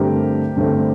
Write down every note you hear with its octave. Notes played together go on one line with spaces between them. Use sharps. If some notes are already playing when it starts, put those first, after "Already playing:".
Already playing: G2 D3 A3 C4 G4 A#4
G2 D3 A3 C4